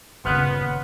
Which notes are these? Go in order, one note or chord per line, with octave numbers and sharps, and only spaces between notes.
G1 D#2 A#2 C#3 B3 C6 F6 F#6